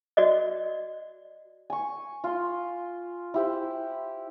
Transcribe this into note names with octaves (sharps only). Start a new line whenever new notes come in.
F#4 D5 D#5
G#5 C#6
F4 C6
E4 G4 C5